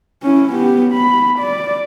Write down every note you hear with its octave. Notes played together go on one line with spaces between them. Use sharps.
C#4 E4
B3 G4
B5
D5